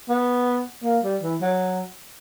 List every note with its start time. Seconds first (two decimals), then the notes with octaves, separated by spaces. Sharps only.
0.09 B3
0.84 A#3
1.03 G3
1.22 E3
1.41 F#3